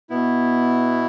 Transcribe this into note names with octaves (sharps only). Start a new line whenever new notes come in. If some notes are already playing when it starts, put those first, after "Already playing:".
B2 B3 E4